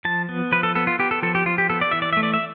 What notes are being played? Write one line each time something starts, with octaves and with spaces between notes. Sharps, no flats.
F3 A5
B3
F3 B4
A4
B3 A4
F4
B3 G4
A4
F3 A4
G4
F3 F4
G4
B3 A4
D5
E3 E5
D5
A3 E5
D5
E5